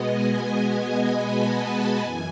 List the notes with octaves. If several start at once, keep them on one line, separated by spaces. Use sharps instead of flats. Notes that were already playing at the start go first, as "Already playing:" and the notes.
Already playing: B2 G#3 B3 D#5 G#5
G#5
B5
A5
F#2 E3 G#5